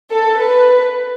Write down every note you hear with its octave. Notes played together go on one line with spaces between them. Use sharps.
A4
B4